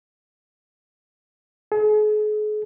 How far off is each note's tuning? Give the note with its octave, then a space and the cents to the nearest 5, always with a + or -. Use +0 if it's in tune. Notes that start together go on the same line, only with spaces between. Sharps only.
G#4 +40